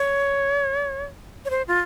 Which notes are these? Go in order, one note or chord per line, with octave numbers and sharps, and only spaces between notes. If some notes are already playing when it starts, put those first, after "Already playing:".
Already playing: C#5
C#5
C5
F4